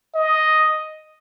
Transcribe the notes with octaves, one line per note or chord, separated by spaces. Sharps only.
D#5